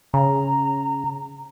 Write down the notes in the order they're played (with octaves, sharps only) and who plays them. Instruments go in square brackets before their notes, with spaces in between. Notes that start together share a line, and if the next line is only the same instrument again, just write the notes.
[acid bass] C#3 [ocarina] A#5